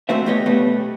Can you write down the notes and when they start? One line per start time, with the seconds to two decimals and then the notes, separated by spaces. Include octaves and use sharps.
0.09 A3 A#3 C4 F#4 C5 E5
0.26 A3 B3 G4 C#5 D#5
0.46 B2 G3 A3 B3